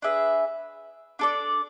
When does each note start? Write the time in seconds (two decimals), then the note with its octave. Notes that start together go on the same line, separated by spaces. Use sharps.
0.02 D4 G#4 B4 E5
1.19 D4 A4 D5